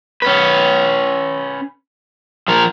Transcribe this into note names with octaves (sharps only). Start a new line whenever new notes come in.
C#4 B4
F3 A#4